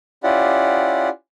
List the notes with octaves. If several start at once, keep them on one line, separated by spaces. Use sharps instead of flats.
C#4 E4 F4 G4 D5 F#5